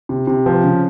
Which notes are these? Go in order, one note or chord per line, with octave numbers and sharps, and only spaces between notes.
C3
C3
F3
C#3